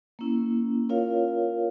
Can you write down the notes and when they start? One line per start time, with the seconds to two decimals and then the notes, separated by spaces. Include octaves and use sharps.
0.19 A#3 C#4 E4
0.89 F4 A#4 C#5 F5